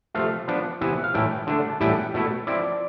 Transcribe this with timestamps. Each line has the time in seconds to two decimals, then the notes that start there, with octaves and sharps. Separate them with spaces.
0.14 C3 F3 A3 F5
0.48 F3 B3 D4
0.81 C3 E3 B3 E4 E5
1.04 F5
1.14 A2 E3 A3 E4 G5
1.47 D3 A3 D4
1.70 A5
1.80 A2 E3 G3 B3 E4 G5
2.14 B2 A3 E4
2.47 F3 C4 E4 D5